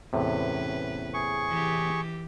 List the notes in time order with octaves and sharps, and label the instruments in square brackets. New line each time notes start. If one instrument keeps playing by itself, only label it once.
[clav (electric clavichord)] E2 A2 C3 [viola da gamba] C#4 B4
[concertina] G#4 C#6
[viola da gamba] E3 G4